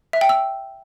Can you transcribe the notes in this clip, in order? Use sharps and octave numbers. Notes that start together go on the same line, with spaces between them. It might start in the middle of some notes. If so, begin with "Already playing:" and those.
E5
G5
E6